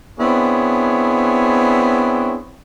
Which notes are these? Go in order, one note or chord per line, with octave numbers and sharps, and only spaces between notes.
B3 C4 D4 E4 G#4 C#5